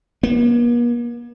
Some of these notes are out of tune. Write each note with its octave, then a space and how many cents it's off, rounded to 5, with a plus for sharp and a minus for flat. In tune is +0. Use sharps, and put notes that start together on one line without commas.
A#3 +45